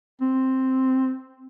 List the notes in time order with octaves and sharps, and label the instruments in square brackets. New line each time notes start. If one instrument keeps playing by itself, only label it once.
[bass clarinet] C4